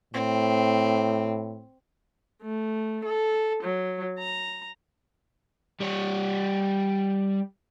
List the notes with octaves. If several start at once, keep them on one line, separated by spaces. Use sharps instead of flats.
A2 C4
A3
A4
F#3
A#5
G3 C#5